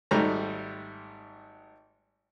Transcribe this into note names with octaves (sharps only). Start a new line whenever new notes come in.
G#1 G#2 G3 A3 A#5